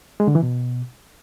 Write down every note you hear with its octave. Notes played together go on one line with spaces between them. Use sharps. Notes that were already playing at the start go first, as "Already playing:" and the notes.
G#3
D3
E3
B2